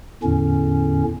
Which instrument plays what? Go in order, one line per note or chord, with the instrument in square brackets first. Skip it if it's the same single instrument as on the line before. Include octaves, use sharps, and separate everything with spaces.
[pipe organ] E2 A2 D3 C#4